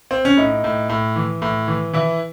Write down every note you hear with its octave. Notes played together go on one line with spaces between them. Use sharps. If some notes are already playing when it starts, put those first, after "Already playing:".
C4
C#4
A2 D#4
A2
A2
E3
A2
E3
E3 E4